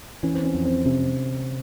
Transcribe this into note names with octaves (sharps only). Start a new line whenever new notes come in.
E3 C#4
C4
C#4
F2
C4
C3 C#4
C4